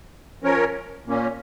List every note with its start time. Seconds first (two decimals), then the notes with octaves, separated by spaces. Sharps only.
0.43 F3 C#4 A#4 C#5
1.05 A#2 A#3 C#4